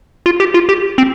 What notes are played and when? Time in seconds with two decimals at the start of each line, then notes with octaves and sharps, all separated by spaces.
0.26 F4
0.40 G4
0.54 F4
0.69 G4
0.98 C4